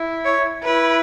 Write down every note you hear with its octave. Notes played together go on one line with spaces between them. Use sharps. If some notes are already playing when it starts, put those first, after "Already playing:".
Already playing: E4
C#5
E4 B4